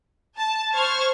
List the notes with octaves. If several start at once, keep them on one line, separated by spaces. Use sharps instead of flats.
A5
C5 C#6 F6 G#6